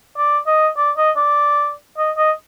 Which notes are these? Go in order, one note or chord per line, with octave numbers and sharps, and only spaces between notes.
D5
D#5
D5
D#5
D5
D#5
D#5